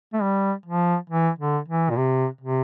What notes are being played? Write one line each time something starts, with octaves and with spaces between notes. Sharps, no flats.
A3
G3
F3
E3
D3
E3
A#2
C3
C3